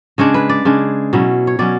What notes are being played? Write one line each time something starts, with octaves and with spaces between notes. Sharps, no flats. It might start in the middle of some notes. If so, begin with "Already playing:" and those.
C#3 G#3 D4 C#5
B4
D5
C#3 G#3 D4
B2 F#3 C#4 E4
C#5
B2 F#3 C#4 D5